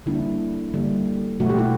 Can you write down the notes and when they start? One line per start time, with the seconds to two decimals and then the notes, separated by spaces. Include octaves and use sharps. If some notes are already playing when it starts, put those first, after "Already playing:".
0.06 D3 G3 A#3 D4 E4
0.74 D3 G3 A#3
1.40 B2 F#3 A3 F#4
1.49 G4
1.59 E4 F#4